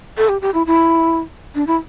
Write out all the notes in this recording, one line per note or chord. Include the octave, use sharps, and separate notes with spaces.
A4
G4
G4
E4
E4
D4
E4